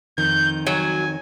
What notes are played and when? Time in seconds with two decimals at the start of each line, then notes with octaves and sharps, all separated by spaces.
0.18 F2 D#3 G6
0.67 F#3 G#5